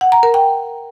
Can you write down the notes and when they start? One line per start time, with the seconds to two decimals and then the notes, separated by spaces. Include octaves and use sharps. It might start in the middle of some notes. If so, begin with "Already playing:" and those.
0.01 F#5
0.12 A#5
0.23 A#4
0.34 G5